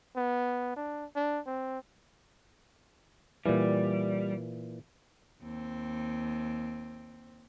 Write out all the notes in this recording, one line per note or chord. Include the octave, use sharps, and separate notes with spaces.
B3
D4
D4
C4
A#2 E3 G3
D#2 C4